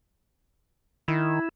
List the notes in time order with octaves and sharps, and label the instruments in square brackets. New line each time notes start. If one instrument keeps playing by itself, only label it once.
[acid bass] D#3 [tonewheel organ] E4